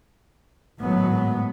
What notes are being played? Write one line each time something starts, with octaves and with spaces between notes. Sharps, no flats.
G#1 A2 F#3 G#3 B3